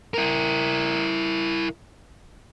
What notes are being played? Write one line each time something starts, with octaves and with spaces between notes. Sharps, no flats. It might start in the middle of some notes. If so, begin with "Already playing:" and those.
E4 A#4